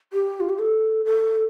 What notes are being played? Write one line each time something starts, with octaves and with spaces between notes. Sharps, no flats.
G4
F4
G4
A4
A4